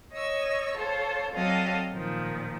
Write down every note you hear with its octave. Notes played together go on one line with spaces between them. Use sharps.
C#5 D#5 C#6 E6
F4 A4 C5 C#5
F#3 C4 A4 D5 D#5 F5
A#2 D#3 F3